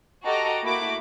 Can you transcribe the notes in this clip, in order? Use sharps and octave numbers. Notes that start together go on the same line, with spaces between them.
F#4 G4 A4 D#5 A#5 D6
A3 A#3 E4 F#4 B5 D6